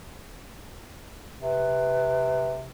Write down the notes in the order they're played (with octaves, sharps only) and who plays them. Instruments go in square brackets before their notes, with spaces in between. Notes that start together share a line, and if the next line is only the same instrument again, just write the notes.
[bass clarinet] C3 [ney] B4